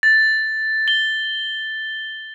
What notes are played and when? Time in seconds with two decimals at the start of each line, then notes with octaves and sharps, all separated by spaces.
0.03 A6
0.88 G7